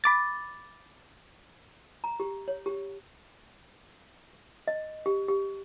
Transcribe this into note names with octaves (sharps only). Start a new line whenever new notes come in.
B5 D6 A6
A#5
G4
C#5
G4
D#5
G4
G4